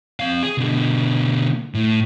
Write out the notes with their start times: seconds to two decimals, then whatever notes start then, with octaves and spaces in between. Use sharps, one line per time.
0.20 C4 F5
0.43 G#4
0.58 B2 D3
1.75 A2